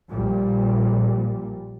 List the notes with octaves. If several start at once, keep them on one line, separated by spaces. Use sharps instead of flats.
A#1 A#2 G3